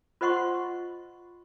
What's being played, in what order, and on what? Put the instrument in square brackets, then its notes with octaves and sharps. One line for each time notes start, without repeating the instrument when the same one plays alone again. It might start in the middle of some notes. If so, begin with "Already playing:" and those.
[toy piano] F4 C5 D#5 F#5 C6 C#6